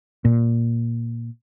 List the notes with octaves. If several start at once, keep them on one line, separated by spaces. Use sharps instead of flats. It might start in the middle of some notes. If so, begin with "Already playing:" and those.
A#2